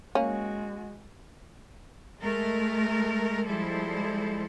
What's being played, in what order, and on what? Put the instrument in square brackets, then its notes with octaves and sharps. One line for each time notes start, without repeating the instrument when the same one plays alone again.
[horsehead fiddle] G#3 F#4 [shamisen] A#3 C#4
[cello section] G#3 A3 A#4
F3 G3 G#3 E4 A4 C5